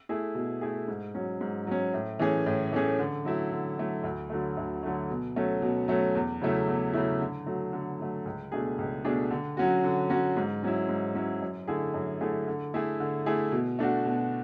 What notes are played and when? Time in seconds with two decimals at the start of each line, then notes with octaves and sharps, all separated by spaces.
0.09 A3 E4 G#4
0.35 B2
0.61 A3 E4 G#4
0.88 G#2
1.15 F#3 C#4
1.41 G#2
1.67 F#3 C#4
1.94 A2
2.19 E3 A3 C#4 G#4
2.46 A2
2.72 E3 A3 C#4 G#4
2.99 D3
3.25 F#3 A3 E4
3.52 D3
3.78 F#3 A3 E4
4.04 D2
4.30 D3 F#3 A3
4.57 D2
4.83 D3 F#3 A3
5.10 B2
5.36 F#3 A3 C#4
5.62 B2
5.88 F#3 A3 C#4
6.15 E2
6.42 C#3 F#3 A3 E4
6.67 E2
6.93 C#3 F#3 A3 E4
7.20 D3
7.47 F#3 A3
7.73 D3
8.00 F#3 A3
8.25 C#2
8.52 B2 A3 D4 G#4
8.78 C#2
9.05 B2 A3 D4 G#4
9.31 D3
9.57 F#3 C#4 F#4
9.84 D3
10.10 F#3 C#4 F#4
10.37 G#2
10.63 F#3 C#4 E4
10.89 G#2
11.15 F#3 C#4 E4
11.42 F#2
11.68 D3 A3 E4 G#4
11.94 F#2
12.21 D3 A3 E4 G#4
12.47 D3
12.74 A3 E4 G#4
13.00 D3
13.26 A3 E4 G#4
13.52 B2
13.79 A3 D4 F#4
14.06 B2